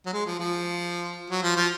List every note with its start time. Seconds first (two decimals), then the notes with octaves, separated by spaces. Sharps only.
0.06 F#3
0.13 G#3
0.26 F3
0.40 F3
1.30 F#3
1.43 F3
1.56 F3